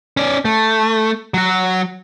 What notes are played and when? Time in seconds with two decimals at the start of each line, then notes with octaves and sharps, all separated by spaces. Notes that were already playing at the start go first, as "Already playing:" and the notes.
0.17 C#4 D5
0.45 A3
1.34 F#3 F#4